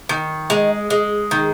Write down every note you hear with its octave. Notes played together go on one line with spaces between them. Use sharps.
D#3
G#3
G#3
D#3